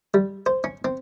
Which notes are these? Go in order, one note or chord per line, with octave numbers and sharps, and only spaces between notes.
G3
C5
C#4
C4